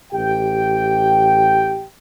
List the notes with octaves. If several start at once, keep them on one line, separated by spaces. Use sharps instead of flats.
A1 G4 G5